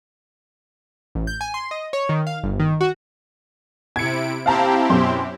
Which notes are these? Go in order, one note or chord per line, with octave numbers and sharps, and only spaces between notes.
A1
G6
G#5
C6
D#5
C#5
D#3
F5
G1
D#3
F#4
C3 E4 G#6 C#7 D7
C4 E4 G4 F5 A5 A#5
F#2 B2 C6